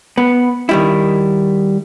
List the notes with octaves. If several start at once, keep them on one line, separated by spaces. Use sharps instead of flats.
B3
D#3 G3 E4